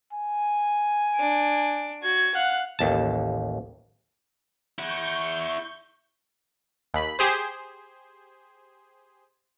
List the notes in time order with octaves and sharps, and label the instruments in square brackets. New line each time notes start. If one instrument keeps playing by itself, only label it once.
[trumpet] G#5
[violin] D4 D7
F#4 G#6
[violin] F5 F#6 [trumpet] F#5
[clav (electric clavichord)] A1 D#2 A5
[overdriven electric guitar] E4 F#5 [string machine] C#6 G6
[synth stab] D#2 B5
G4 G#4 C5